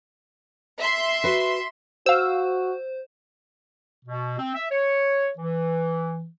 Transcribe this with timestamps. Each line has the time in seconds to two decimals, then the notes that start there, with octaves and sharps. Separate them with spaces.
0.80 E5 C6
1.24 F#4 B4
2.06 F#4 C5 F5 E6
4.06 B2
4.39 C4
4.55 E5
4.71 C#5
5.38 E3